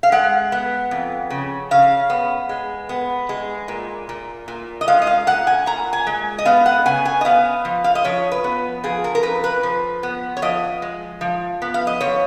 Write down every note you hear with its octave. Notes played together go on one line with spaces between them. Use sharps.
F5
G#3 F#5
B3
F2
C#3
C#3 F5
B3
G#3
B3
G#3
A#2
A#2
A#2
D#5
G#3 F5
D#5
F5
A#2 F#5
G#5
A#2 A#5
G#5
G#3
D#5
B3 F5
F#5
C#3 G#5
G#5
D#5
B3 F5
F3
F5
D#5
F3 C#5
B4
B3
F3 G#4
A#4
A#4
F2 B4
B4
F3
B3
C#5
F3 D#5
G#3
F3
B3
F5
D#5
F3 C#5